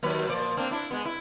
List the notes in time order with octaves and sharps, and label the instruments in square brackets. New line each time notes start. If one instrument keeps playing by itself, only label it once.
[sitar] D#2 F#3 B4
A#2 F3 D5
A#3 C4 D4
D4 E4
G#3 B3
E4